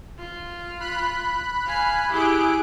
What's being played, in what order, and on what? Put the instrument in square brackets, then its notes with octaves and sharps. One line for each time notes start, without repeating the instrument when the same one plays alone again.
[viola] F4
[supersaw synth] B5 F#6
[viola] F5 G#5
[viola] E4 G4 [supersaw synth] G#4 F#6 D7